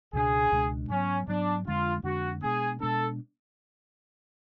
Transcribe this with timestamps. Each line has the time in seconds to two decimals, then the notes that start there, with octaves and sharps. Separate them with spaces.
0.13 C#2 B2 G#3 D4 G#4
0.52 C#2 B2 G#3 D4
0.89 G#2 F#3 B3 C#4
1.27 G#2 F#3 B3 D4
1.65 F2 D3 G#3 D4 F4
2.03 F2 D3 G#3 D4 F#4
2.41 B2 G#3 B3 D4 G#4
2.80 B2 G#3 B3 D4 A4